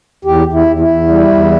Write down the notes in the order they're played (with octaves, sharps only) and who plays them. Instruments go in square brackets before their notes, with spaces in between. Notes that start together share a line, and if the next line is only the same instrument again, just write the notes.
[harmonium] E2 G4
E2
E4
E2
E4
E2
G3
E2